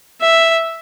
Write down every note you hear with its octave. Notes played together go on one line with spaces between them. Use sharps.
E5